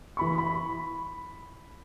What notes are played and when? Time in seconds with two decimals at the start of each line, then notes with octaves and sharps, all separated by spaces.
0.17 E3 B5 C#6
0.38 B5